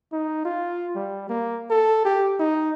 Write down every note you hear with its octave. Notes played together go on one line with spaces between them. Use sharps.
D#4
F4
G3
A#3
A4
G4
D#4